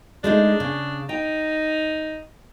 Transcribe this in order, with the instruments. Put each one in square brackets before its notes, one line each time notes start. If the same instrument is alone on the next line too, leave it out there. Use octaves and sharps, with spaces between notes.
[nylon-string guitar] G#3 A3 D#4 [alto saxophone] D4
[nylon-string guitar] C#3
[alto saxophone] D#4 [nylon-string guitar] G5